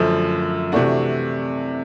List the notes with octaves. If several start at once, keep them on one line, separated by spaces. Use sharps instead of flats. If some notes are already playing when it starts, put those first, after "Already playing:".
Already playing: F#2 D3 F3 A3
C3 E3 A3 D4 F#4